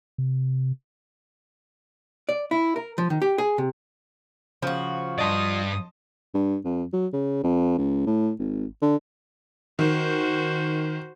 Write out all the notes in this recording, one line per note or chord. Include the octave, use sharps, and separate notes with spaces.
C3
D5
E4
A#4
F3
D#3
G4
G#4
C3
C#3 F3 F#4
G2 D5 D#5 A5 C6 D#6
G2
F2
F#3
C#3
F2
C#2
A2
G#1
D3
D#3 F#4 C5